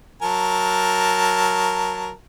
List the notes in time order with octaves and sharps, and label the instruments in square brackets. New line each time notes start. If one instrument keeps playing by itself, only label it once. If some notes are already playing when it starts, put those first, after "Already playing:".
[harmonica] F#3 A#4 A5